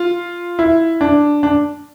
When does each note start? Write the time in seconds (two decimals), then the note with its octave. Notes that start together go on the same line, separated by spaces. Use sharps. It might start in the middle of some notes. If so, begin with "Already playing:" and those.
Already playing: F4
0.59 E4
1.01 D4
1.43 D4